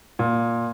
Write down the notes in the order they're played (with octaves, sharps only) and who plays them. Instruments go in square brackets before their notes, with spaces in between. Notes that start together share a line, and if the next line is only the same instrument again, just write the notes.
[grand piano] A#2